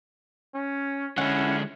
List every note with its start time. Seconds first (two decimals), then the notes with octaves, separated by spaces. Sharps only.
0.55 C#4
1.18 D3 G#3 C#4 E4 F#5